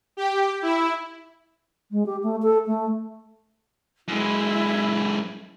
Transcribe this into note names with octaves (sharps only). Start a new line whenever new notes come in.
G4
E4
G#3
G4
A3
A4
A3
F#2 G#3 E4